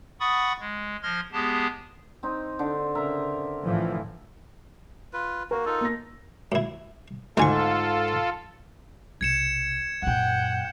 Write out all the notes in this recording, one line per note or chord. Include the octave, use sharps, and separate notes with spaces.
F#5 B5 C#6 D#6 A6
G#3
F3 C6 F6 G#6 A#6
G#3 B3 G4 G#4 A5
C4 D#4
D3
C#3 A#4 E5 A#5
A2 E3 F3
F4 B4
A#3 F#4 A#4
D#4 F4 A4
A#3 A#6
F#2 E4
D2 G#2 F4 A4 G#5 C#6
B1 C3 G#6 C#7 E7
F#2 A#2 F#5 G5